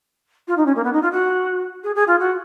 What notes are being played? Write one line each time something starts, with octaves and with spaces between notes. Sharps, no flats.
F4
D#4
C#4
A#3
B3
D#4
F4
F#4
G#4
G#4
F4
F#4